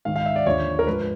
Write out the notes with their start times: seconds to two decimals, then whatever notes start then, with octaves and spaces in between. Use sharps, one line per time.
0.05 G#2 D#3 F5
0.16 F5
0.26 E5
0.36 D5
0.46 D#2 D3 F3 C#5
0.79 A#4
0.87 G#2 F3 B4